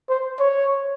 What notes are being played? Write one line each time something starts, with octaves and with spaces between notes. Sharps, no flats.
C5
C#5